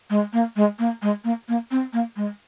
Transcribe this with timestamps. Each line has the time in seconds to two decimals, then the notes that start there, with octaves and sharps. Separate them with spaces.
0.10 G#3
0.33 A#3
0.56 G#3
0.79 A#3
1.02 G#3
1.24 A#3
1.48 A#3
1.71 C4
1.93 A#3
2.16 G#3